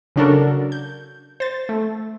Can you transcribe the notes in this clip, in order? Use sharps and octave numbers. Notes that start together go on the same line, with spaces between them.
C#3 F#3 D4 F#4 A4 A#4
G6
C5 A6
A3